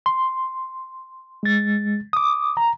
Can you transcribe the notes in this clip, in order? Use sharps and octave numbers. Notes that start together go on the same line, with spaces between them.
C6
G#3 A6
D6 D#6
A#5